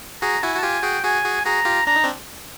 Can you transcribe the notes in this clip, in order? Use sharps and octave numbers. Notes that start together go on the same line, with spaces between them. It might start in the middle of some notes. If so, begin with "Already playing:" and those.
F#4 G#4 A#5
E4 F#4 G#5
F#4
A5
F4 G4 G#5
F#4 G#4 G5
F#4 G#4 G#5
F#4 G#4
F#4 G#4 A#5
F4 G4
D4 A#5
D#4
C4 D4